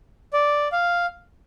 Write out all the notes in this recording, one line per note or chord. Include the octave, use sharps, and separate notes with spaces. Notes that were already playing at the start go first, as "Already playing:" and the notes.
D5
F5